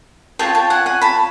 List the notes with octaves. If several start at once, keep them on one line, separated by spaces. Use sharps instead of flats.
F4 G#4 C#5 G5 A5
G5 A5
F#5 G#5
F#5 G#5
A5 B5